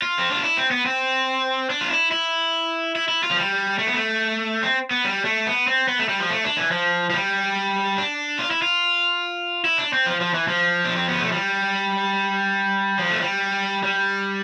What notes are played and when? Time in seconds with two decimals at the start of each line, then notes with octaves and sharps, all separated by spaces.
0.02 F4
0.19 C4
0.31 D4
0.43 E4
0.57 C4
0.71 B3
0.86 C4
1.70 D4
1.81 F4
1.90 E4
2.12 E4
2.96 E4
3.08 E4
3.23 F4
3.31 F3
3.36 G3
3.79 A3
3.87 B3
3.94 A3
4.63 C4
4.91 B3
5.05 G3
5.25 A3
5.47 B3
5.67 C4
5.88 B3
5.99 A3
6.09 G3
6.20 F3
6.30 A3
6.44 D4
6.58 E3
6.71 F3
7.10 F3
7.14 G3
7.98 D4
8.39 F4
8.51 E4
8.62 F4
9.65 E4
9.78 D4
9.93 C4
10.06 F3
10.21 F3
10.34 E3
10.48 F3
10.85 D4
10.96 C4
11.09 B3
11.21 A3
11.32 G3
12.99 F3
13.11 A3
13.21 G3
13.84 G3